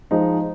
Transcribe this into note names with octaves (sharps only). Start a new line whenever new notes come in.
F3 G#3 D#4